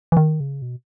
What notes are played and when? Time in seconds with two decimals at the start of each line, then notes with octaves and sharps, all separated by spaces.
0.12 E3
0.17 D#3
0.40 C#3
0.62 B2